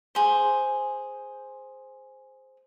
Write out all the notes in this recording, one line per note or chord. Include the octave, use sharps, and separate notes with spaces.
G#4 C5